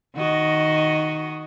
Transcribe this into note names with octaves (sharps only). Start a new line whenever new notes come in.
D#3 F#4 D#5